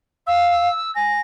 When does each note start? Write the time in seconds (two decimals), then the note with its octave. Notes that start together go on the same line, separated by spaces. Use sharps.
0.27 F5 E6
0.95 G#5 A#6